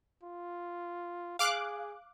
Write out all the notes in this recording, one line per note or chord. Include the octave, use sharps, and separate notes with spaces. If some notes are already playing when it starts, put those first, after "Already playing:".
F4
G#4 F5 D6 F#6